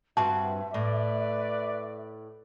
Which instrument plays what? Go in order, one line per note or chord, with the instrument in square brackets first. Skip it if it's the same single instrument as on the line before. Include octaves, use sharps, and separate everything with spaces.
[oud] G2 C4 F#4 [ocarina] E5 [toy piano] A5
[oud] A2 [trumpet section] B4 D5